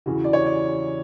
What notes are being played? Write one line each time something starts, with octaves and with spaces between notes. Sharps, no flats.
E2 C#3 E3 F#4
D5
C#5
D5